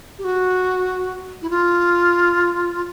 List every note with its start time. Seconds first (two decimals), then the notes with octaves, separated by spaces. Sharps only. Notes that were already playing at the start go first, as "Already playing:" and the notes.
0.19 G4
0.24 F#4
1.42 E4
1.50 F4